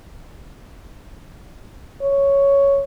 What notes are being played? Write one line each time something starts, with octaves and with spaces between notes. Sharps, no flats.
C#5